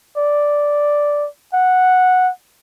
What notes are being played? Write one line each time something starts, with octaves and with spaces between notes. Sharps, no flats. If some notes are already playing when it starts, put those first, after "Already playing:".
D5
F#5